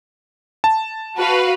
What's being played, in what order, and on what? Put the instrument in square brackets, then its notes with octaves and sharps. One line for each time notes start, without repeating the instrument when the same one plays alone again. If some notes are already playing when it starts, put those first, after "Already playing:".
[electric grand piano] A5
[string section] F#4 B4 F5